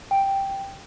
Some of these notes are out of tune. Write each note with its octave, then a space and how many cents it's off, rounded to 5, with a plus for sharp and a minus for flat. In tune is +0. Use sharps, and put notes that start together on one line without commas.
G5 +0